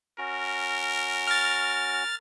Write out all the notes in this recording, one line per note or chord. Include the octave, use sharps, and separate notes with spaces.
C#4 F#4 A#4
F6 A6